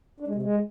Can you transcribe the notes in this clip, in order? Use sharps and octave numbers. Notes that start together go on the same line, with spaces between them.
D4
G#3
C3
G#3